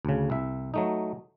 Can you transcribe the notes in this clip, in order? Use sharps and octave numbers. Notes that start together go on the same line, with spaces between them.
D2 C#3
C2 E5
F#3 A3 D#4